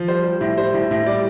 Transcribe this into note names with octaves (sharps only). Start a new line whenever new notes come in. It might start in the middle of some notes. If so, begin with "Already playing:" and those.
Already playing: F3
G3 C5
G3
A2
G3 C5
A2
A2
G3 D5